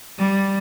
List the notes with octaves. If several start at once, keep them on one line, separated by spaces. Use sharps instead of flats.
G3